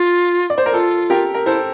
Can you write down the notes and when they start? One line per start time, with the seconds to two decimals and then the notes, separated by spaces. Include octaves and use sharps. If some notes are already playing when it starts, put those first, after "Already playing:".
Already playing: F4
0.50 D5
0.58 C5
0.66 A#4
0.73 F4 A4
1.10 G4 A#4
1.34 A#4
1.46 E4 A4 C5